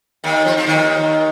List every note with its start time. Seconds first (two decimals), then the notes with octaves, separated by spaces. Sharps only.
0.24 D#2 D#3
0.45 F2 F3
0.57 F3
0.67 D#2 D#3